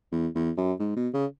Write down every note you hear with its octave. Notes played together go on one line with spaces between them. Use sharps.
E2
E2
F#2
G#2
B2
C#3